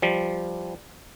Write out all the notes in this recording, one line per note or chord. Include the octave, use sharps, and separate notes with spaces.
F3 G3